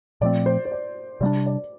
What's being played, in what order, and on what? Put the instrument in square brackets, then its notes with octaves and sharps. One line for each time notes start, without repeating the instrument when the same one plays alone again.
[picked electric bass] A#2 F3 A3 C4 [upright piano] D5
[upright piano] C5
C5
D5
[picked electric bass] C3 G3 A#3 [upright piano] D5
[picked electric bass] D4
[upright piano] D5